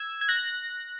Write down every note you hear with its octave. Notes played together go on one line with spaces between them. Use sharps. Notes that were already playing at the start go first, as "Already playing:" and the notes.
Already playing: E6 G#6
G#6
F#6 A#6